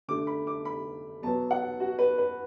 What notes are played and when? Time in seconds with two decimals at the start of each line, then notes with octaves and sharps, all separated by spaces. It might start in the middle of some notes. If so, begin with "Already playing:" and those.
0.08 D3 A3 D4 D6
0.27 B5
0.47 D6
0.65 B5
1.22 E2 B2 F#3 B3 A5
1.51 F#5
1.80 F#4
1.99 B4
2.18 B4